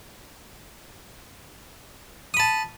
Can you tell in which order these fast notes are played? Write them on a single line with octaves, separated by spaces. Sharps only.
D#6 B5 A5